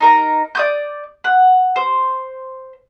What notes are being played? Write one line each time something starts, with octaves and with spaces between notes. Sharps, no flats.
D#4 A#4 A#5
D5 D#6 G6
F#5
C5